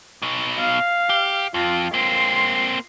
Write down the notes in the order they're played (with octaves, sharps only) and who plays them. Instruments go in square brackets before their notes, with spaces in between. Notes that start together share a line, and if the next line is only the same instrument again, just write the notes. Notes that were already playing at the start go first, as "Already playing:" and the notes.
[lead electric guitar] B2 D#4
[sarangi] F5
[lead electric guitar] G4
[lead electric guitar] F2 [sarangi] F4
[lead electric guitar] A#3 C4 [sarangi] C6